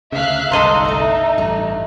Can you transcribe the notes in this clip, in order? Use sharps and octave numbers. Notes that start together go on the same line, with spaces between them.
D2 C#3 E5 F5 F#6
G1 C2 G#3 D#4 A4 D#5 C6
C#3 A3
A1 G2 D4